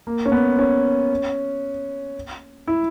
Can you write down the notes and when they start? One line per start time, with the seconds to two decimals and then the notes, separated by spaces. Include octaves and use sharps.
0.07 A#3
0.26 C#4
0.32 B3
0.59 C#4
2.67 E4